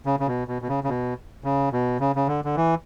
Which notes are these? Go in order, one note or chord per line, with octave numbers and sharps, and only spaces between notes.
C#3
C#3
B2
B2
B2
C#3
C#3
B2
C#3
B2
C#3
C#3
D3
D3
E3